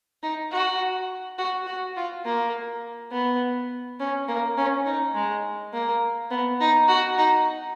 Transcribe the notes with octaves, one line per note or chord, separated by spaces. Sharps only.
D#4
F#4
F#4
F#4
F4
A#3
B3
C#4
A#3
C#4
D#4
G#3
A#3
B3
D#4
F#4
D#4